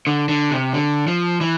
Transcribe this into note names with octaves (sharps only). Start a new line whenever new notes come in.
D3
D3
C3
D3
F3
E3